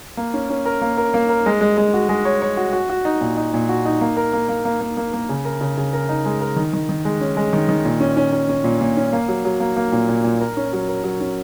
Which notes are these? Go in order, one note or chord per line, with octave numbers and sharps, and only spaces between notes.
A#3
C#4
C#4
A#4
A#3
A#4
A#3
A#4
G#3
G#3
G#3
F#4
G#3
C#5
C#5
F#4
F#4
F#4
D#4
A#2
D#4
A#2
F#4
D#4
A#3
A#4
A#3
A#3
A#3
A#3
A#3
A#3
C#3
A#4
C#3
C#3
A#4
D#4
G#3
A#4
D#3
D#3
D#3
G#3
C#4
G#3
D#3
D#3
A#2
C#4
C#4
C#4
C#4
A#2
A#2
C#4
A#3
F#3
F#3
A#3
A#3
A#2
A#2
A#2
A#4
C#4
F#3
A#4
F#3
C#4